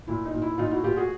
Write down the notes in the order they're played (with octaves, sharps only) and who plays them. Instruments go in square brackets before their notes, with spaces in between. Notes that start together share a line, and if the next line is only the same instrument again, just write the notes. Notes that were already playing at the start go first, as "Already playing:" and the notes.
[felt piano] A#2 E4
D#4
A#2
E4
A#2 D#4 F4
E4 F#4
A#2 F4 G4
F#4 G#4